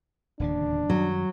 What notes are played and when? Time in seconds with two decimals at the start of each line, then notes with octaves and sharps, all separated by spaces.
0.40 D1 D#2 C#3 D4
0.90 F#2 D#3 F#3 G3